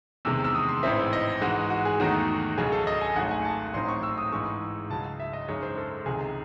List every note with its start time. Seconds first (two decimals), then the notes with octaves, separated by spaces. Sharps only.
0.25 E2 C3 D#3 G#3 E6
0.44 E6
0.55 D#6
0.69 C6
0.83 A1 G#2 E3 C4 E5
1.13 D#5
1.41 G#2 E3 G#3 F#4
1.70 F#4
1.85 G#4
2.00 E2 D#3 F#3 A3 D#4 F#4
2.58 C#2 C#3 F#3 C#4 G#4
2.72 A4
2.87 D#5
3.01 G#5
3.16 G#1 G#2 F#3 A3 F#5
3.31 G#5
3.45 A5
3.74 A1 A2 F#3 C4 D#4 C6
3.88 C#6
4.03 E6
4.18 D#6
4.32 G#2 E3 G#3 C#6
4.90 C#2 C#3 F#3 A5
5.20 E5
5.33 D#5
5.48 F#2 C#3 G#3 D#4 C#5
5.63 C5
5.78 A4
6.06 C#2 C3 D#3 G#4